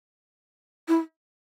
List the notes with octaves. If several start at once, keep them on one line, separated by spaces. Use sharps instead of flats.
E4